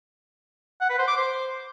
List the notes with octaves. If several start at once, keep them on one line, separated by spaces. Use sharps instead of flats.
F#5
B4
C5
D6
C5